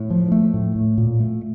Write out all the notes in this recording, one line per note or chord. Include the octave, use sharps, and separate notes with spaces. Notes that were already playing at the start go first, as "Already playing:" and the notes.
Already playing: A2
F3
A3
A2
A2
A#2
A3